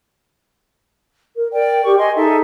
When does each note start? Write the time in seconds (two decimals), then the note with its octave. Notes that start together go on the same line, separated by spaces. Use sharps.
1.36 A#4
1.52 A#4 D5 G5
1.85 G4 C#6
1.98 D#5 G#5 C6
2.16 D#4 G#4 A4 E5